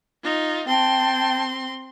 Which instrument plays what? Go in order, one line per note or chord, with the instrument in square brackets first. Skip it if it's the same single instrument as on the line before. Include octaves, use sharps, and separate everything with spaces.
[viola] D#4 F4
[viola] C4 C6 [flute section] G5 A5